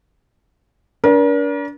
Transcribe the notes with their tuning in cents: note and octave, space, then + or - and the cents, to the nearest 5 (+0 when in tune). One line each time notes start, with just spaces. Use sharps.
D4 -35 A#4 +40